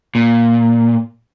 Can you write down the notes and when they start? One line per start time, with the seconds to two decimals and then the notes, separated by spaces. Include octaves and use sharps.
0.15 A#2